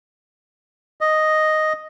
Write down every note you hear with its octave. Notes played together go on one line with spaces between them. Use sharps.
D#5